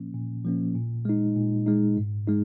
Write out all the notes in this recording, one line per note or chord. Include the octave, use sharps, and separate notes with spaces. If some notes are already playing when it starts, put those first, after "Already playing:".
Already playing: A#2 F3 A#3 C#4
A#2
F3 A#3 C#4
A#2
G#3 D#4
A#2
G#3 D#4
G#2
G#3 D#4